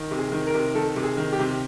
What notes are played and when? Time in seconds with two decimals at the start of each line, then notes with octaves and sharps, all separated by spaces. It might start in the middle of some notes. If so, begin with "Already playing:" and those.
Already playing: D#3
0.11 C3
0.18 G#4
0.32 D#3
0.47 A#4
0.54 C3
0.75 D#3 A4
0.96 C3
1.03 G#4
1.17 D#3
1.32 G4
1.39 C3